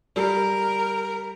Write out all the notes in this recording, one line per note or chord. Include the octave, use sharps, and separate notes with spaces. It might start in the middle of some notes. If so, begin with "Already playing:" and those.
G3 A#4